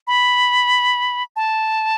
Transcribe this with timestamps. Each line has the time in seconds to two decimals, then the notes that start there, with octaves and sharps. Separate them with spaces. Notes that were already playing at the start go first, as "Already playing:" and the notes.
0.07 B5
1.36 A5